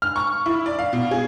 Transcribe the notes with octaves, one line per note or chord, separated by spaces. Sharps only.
F6
C#6
E4
D5
F5
B2
G#4